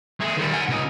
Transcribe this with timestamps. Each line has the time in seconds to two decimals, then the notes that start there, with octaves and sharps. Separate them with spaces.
0.21 A3 G#4
0.37 D#3 G3
0.53 F#5 G#5
0.69 C#2 D#4